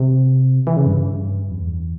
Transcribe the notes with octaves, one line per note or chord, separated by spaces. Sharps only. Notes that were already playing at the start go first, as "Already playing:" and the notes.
Already playing: C3
E3
C#3
G2
F2
E2